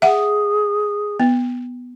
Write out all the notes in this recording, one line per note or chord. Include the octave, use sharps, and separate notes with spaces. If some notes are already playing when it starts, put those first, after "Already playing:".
G#4 E5 F#5
B3